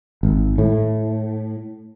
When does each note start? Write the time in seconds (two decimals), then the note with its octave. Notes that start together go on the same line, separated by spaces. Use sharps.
0.23 G#1
0.58 A2